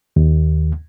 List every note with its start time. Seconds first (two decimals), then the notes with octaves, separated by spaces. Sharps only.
0.16 D#2